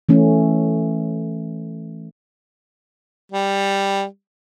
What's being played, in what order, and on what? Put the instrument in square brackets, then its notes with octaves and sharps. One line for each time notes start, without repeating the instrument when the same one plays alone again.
[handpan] E3 A3 C#4
[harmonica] G3